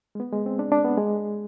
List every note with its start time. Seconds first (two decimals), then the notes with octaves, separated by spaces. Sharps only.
0.15 G#3
0.20 B3
0.33 G#3
0.46 C4
0.59 D4
0.72 D4
0.85 B3
0.97 G#3